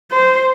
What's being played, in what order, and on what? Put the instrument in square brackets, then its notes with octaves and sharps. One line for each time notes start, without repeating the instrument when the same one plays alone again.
[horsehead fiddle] C5